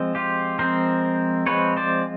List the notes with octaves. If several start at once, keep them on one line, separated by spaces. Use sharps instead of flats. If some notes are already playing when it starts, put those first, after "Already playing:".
Already playing: F3 G#3 C4
F4 G4
F3 G#3 C4 A#4 C5
F3 G#3 C4 B4 C#5
C5 D5